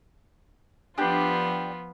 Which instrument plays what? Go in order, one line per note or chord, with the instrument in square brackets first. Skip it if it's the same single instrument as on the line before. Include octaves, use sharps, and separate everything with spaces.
[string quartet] F3 B3 F4 [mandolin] D4 G4